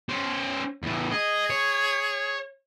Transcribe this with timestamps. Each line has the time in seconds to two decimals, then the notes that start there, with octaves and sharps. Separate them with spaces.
0.09 C#4 C5
0.83 E2 A2
1.12 G#4 D#5
1.50 C#5